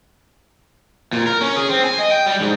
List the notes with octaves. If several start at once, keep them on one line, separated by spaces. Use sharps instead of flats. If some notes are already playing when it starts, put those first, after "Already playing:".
A#2
A#4
C#4
G#4
C4
G#5
D#5
G5
G3
G#2